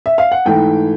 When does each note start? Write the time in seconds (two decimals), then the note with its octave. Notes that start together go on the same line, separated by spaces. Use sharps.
0.06 E5
0.18 F5
0.32 F#5
0.45 G#2 E3 A3 G5